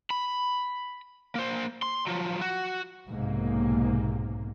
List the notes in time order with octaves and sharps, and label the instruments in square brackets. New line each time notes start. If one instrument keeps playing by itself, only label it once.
[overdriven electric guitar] B5
A#3 C5
C6
F3 F#3
F#4
[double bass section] B1 G#2 C3 A#3